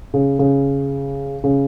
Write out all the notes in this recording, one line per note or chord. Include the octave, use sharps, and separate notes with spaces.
C#3
C#3
C#3